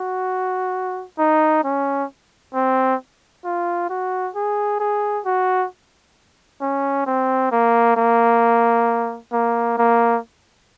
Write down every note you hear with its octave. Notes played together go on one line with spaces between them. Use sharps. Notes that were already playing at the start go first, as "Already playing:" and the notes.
Already playing: F#4
D#4
C#4
C4
F4
F#4
G#4
G#4
F#4
C#4
C4
A#3
A#3
A#3
A#3